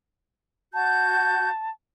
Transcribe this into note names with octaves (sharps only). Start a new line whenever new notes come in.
F#4 A5 G6